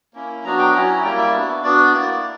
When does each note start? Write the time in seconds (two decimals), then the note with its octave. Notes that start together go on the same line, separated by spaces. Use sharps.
0.14 A#3 C#4 E4
0.44 F#3 B3 D4 F#4 A#5
0.59 G5
0.74 F#3 C#4 E4 A#5
0.88 A#5
1.03 G3 A#3 E4 G5
1.18 E5
1.34 B3 D4 F#4
1.63 B3 D4 F#4 D5
1.93 A#3 E4